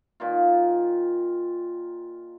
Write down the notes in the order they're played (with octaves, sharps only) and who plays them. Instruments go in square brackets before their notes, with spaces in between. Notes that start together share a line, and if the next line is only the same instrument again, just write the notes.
[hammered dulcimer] A#2 D#3 F4